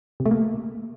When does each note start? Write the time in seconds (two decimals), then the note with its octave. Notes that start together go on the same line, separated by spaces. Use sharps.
0.20 C3
0.26 A3
0.31 A#3